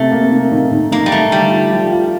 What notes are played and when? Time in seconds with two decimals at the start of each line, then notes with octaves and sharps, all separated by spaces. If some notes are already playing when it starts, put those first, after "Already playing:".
Already playing: C3 A3
0.12 A#3
0.32 C3
0.52 D#3
0.72 D#3
0.92 D#3 A#3
1.06 G3
1.12 A3 D#4
1.32 D3 G3
1.52 F4
1.72 F3
1.92 F4